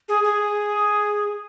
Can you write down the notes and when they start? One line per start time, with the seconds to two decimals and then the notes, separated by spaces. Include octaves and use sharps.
0.09 G#4
0.24 G#4